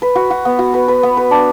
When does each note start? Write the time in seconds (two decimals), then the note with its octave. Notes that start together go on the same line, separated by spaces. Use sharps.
0.02 B4
0.15 F#4
0.30 F#4
0.45 B3
0.59 F#4
0.74 B4
0.88 B4
1.03 B3
1.17 B4
1.31 D4